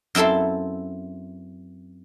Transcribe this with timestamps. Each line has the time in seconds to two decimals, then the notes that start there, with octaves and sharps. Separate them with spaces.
0.15 F#2 C4 E4 A4 C6